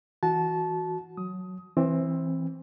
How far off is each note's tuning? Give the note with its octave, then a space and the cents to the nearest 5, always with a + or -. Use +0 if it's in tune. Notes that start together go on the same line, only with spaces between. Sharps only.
E3 -10 F#4 -10 A5 -20
F#3 +0 D#6 +15
E3 +0 C4 +15